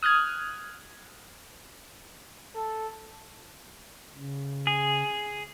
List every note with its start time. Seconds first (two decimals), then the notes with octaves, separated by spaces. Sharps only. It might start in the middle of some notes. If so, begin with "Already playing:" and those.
0.03 D#6 F6 F#6 G#6
2.55 A4
4.16 C#3
4.67 G#4